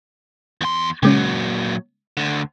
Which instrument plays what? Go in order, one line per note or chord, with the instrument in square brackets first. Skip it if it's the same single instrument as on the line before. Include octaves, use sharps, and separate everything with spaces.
[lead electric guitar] E2 C6
[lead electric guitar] A#2 F#3 [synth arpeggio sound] C#3 G#3 C#4
[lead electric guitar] D2 D3